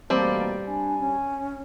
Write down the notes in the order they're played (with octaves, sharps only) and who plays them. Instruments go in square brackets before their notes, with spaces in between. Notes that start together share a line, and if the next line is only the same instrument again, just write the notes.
[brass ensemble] A1 B2 A5 [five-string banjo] G3 C4 [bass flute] A#3
[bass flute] D4 [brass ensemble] G#5
[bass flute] C#4